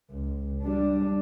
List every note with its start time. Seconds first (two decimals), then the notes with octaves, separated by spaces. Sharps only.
0.11 C#2
0.62 G3 D4